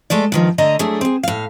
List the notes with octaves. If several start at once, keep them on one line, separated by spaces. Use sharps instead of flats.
G#3 A3 A4 D5
G2 D#3 F3
D3 A3 D#5 A#5
F#3 A3 D4 E4 G#4
C4 G#4
A2 F5